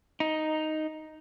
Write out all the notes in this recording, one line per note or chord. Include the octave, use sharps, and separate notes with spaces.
D#4